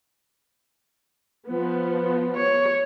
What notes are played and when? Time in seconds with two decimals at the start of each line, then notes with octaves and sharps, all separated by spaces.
1.47 F3 B3
2.36 C#5